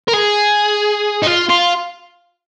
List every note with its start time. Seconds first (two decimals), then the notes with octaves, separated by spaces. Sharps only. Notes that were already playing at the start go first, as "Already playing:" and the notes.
0.08 A#4
0.14 G#4
1.23 D#4
1.27 F4
1.50 F4